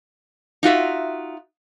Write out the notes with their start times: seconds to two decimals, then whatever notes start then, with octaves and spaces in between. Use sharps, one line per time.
0.63 D#4 F4 F#4 E5